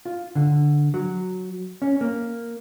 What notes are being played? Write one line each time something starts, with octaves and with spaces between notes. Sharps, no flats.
F4
D3
F#3
C#4
A#3